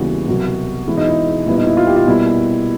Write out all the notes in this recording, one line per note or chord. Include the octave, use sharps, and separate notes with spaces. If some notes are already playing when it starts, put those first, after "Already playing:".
Already playing: D#2 C#3 E3 G3 B3 F#4
C2 B2 F#3 B3
E2 B2 G#3 E4
D#4
E4
A#2 G3 B3 E4
D#4
E4
F4
G4
F4
B2 G3 A#3 E4